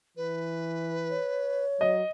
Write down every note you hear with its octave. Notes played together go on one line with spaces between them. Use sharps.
E3 B4
C#5
F#3 D#5